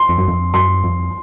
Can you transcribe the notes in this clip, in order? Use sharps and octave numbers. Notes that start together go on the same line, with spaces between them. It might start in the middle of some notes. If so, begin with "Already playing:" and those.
Already playing: C6
F2
F#2
F2
F#2 C6
F2